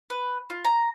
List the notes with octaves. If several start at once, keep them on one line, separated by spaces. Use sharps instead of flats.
B4
F4
A#5